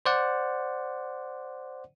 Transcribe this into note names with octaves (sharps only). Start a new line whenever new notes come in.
C5 D5 F#5